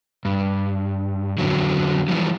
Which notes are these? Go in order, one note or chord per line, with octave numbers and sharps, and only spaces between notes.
G2
F2 D3 F#3
E3 F3 G3